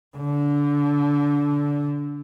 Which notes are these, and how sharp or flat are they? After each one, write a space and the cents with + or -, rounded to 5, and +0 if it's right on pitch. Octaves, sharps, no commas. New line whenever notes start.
D3 -20